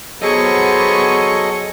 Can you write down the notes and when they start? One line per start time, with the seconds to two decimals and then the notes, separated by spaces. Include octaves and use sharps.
0.21 F#3 B3 G#4 A4 C5 D#5 C#6